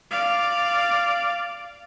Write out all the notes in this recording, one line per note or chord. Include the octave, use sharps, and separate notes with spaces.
D5 F5